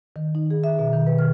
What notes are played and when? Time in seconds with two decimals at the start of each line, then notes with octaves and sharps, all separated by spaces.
0.16 D#3
0.35 D#4
0.50 G#4
0.64 E5
0.79 B2
0.93 D#3
1.07 B4
1.19 F6